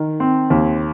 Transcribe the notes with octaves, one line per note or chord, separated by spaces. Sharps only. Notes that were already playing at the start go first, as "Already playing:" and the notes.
Already playing: D#3
C4
D#2